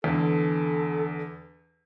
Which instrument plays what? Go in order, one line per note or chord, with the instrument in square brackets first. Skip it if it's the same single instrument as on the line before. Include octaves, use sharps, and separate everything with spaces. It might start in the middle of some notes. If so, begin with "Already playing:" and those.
[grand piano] E2 D3 [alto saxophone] A4